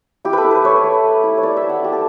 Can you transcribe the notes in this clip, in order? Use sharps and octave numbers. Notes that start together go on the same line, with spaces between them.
E4 G4
A4 B4
E4
B4
A3 C#5
A3
A3
E4
C#5
E4 D5
E5
A3
F#5
E4 G4
A4